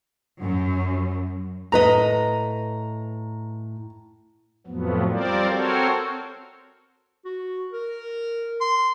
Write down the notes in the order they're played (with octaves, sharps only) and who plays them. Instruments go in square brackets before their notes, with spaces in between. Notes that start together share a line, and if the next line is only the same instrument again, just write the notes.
[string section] F#2
[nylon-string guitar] A2 B4 D#5 [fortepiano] A#5
[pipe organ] F2 A2 F3 F#3 B3
G3 C4 F4 A#4 C5 D5
C4 F#4 A4 A#4 C5 C#5
[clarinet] F#4
A#4
C6